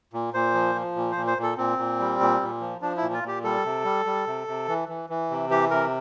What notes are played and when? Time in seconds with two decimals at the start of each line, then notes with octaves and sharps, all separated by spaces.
0.13 A#2
0.34 A#2 C5
0.54 F3
0.75 F3
0.96 A#2
1.11 A#2 C5
1.27 C5
1.38 A#2
1.43 A4
1.57 A#2 C4
1.78 A#2
2.00 G3
2.20 A#2
2.41 A#2
2.61 F3
2.81 F3 D4
2.97 E4
3.02 A#2
3.13 F4
3.23 A#2 G4
3.44 G3 A4
3.64 C3
3.85 G3
4.06 G3
4.27 C3
4.48 C3
4.68 E3
4.89 E3
5.10 E3
5.30 C3
5.50 E3 G4
5.70 C3 A#4